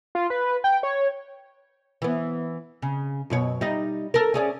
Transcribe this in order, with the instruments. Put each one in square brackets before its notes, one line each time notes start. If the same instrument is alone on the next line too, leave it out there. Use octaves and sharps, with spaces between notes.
[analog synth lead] F4
B4
G5
C#5
[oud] E3 B3
C#3
F#2 B2 C#5
G3 D#4
A4 A#4
C#4 G#4 D5